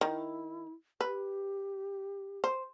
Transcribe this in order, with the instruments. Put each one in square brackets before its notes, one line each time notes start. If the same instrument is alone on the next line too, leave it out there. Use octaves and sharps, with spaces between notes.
[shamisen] D#3 [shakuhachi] E4
[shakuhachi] G4 [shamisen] B4
[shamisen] C5